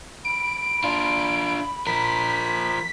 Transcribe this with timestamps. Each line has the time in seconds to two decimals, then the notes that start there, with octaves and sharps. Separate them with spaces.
0.25 B5 D7
0.84 D4 F4
1.87 F3 A#4 B6